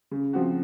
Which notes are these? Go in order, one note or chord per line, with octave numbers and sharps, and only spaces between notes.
C#3
F3 C4 F#4